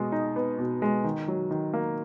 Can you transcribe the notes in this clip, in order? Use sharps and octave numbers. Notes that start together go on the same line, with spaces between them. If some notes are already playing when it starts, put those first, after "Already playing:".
Already playing: B2 G#3
D#4
B3
B2
G#3
D#3
F#3
D#3
A#3